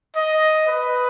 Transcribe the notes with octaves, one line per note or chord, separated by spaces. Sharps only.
D#5
B4